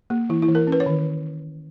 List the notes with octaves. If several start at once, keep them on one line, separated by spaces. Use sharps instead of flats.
A#3
E3 E4
E4
E3
A#4
C#4
B4
C#5
D#3